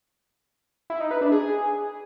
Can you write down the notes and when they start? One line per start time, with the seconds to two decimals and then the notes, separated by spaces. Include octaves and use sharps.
0.90 E4
1.00 D#4
1.11 B4
1.21 D4
1.32 G#4